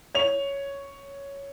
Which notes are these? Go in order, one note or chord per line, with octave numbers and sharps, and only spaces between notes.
C#5 F7